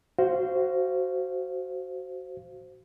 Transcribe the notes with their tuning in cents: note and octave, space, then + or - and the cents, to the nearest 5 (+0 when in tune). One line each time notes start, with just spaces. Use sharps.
F#4 +15 C5 +0 F5 -20